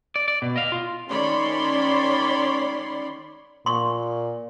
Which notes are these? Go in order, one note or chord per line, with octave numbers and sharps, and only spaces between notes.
D5
D5
B2
D#5 F5
F4
D#3 C#4 C#5 D5 B5 C6
A#2 C6 C#6